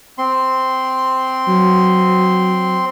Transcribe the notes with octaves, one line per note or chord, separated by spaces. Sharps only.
C4 C6
F#3